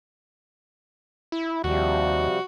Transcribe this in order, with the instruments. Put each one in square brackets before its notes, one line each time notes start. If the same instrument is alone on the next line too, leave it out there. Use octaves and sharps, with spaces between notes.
[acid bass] E4
[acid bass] D#2 [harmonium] C3 F3 G3 [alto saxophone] F#4